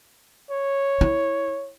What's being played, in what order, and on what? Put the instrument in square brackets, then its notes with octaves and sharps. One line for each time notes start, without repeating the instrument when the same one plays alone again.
[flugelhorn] C#5
[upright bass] E4